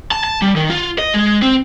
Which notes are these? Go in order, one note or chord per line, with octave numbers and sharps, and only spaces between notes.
A5
A5
G3
D#3
F4
D#5
G#3
C4